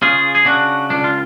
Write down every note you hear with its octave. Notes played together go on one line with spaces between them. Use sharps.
C#3 F4 G#4
G#4
C#3 D4 F#4
C#2 D4
F4